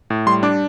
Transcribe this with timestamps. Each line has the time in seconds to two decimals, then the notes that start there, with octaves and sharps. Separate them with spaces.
0.10 A2
0.27 G3 C6
0.43 D4 D6